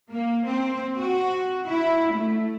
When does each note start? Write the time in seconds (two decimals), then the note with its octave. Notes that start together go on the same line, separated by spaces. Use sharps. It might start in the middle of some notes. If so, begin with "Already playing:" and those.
0.10 A#3
0.46 C4
0.97 F#4
1.69 E4
2.13 A3